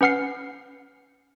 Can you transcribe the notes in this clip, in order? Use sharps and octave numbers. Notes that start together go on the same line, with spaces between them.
C#4 B4 F#5 F6 C7